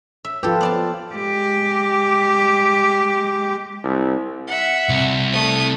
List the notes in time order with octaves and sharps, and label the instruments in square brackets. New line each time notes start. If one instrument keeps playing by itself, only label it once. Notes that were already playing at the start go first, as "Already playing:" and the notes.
[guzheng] E5
[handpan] F3 F4 B4 [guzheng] G4 A4
[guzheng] B3 D5 A5
[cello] G#3 G4
[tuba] C2
[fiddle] E5 F#5
[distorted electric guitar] C2
[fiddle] A3 D#6